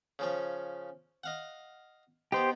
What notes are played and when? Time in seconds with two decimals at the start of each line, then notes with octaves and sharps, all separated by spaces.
0.19 C#3 F3 C#4
1.24 D#5 F5 F#5
2.32 B3 D#4 G4 C5